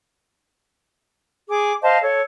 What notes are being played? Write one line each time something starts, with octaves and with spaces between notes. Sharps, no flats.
G#4 D6
C5 D#5 F5 A5
A4 C#5